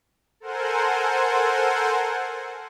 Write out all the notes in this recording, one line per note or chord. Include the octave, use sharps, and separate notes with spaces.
A4 A#4 C5 F#5 G#5